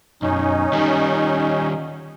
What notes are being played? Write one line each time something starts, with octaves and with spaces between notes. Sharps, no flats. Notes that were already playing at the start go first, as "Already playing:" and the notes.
B1 F#2 C#4 D#4
D#3 G3